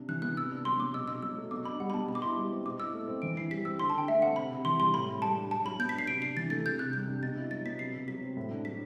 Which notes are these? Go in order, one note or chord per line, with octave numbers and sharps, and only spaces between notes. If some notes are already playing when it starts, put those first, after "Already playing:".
Already playing: C3 D4
E3 F#6
B3 F#6
C3 E6
D4
F#3 C6
B3 D6
B2 E6
B2 E6
F#3 E6
A3
B2 D6
D4 B5
G3 F#5
B5
B3 A5
B2 B5
D6
E4 C6
G3
C4
B2 D6
E4 E6
A3
C4
E3 D7
E4 C7
G3 B6
C4 E6
D3 C6
A5
D3 G5
A3 E5
C4 F#5
C3 B5
C3
E3 C6
G3 C6
A2 B5
A2
G3 A5
D4
F#3 A5
F#3 B5
B3 G6
B6
D4 C7
C3 D7
D4 C7
E3 A6
A3 A6
C3 G6
C3 F#6
G3 G6
D4
B2 A6
E4
F#3 A6
B3 B6
C3 C7
C3
F#3 B6
C4
A2
D4
F#3 B6